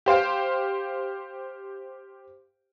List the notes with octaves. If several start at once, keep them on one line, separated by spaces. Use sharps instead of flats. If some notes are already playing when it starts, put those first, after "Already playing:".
G4 C5 F5 G5